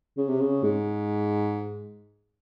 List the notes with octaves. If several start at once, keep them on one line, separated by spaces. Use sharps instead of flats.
C#3
C3
C#3
G#2